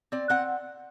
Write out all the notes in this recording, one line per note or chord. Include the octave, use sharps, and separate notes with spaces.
C4 D5
C4 F#5